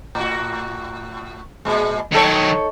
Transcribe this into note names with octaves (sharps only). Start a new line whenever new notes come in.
A2 F#4
A#2 G#3
D#3 F#3 D#4 A4 C#5